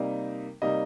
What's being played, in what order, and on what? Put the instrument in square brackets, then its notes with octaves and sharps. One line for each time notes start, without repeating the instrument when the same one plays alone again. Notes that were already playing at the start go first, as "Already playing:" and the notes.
Already playing: [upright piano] C3 G3 A#3 D#4
[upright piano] C3 G3 A#3 D#4 [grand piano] D#5